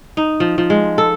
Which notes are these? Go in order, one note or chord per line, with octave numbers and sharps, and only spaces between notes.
D#4
F3
F3
G#3
A4